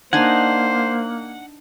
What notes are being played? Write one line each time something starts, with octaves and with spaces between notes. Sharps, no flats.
A#3 D4 D#4 C5 F#5 G#5